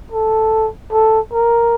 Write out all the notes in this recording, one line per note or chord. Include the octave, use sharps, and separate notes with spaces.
A4
A4
A#4